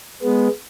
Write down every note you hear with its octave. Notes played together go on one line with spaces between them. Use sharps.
G#3 B3